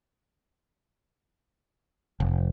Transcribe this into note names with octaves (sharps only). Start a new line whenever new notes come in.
F1